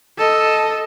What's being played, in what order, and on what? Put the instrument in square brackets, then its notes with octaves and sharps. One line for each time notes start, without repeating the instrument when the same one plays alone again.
[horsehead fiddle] A4 D#5